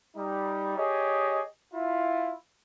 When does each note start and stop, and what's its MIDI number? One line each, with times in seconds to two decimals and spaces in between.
0.16 0.74 55
0.16 0.74 63
0.77 1.41 67
0.77 1.41 68
0.77 1.41 73
0.77 1.41 75
1.74 2.32 64
1.74 2.32 65